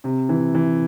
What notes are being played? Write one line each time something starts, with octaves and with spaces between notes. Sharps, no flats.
C3
E3
E3